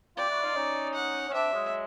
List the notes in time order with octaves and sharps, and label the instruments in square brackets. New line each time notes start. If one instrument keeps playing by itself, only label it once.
[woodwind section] F4 G4 [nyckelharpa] D5
[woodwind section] E4 F#4
D#4 F4
C#4 D#4
[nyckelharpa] F#5
[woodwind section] C#4
[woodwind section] C4 D4 [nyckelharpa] E5
[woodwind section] F#3 G#3